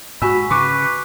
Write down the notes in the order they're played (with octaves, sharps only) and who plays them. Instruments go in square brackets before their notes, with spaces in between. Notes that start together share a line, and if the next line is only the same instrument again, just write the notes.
[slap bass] G#2 [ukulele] F#4 G#5 [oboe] B5 [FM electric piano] E6
[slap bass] C#3 [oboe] B4 [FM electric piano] C#6 D6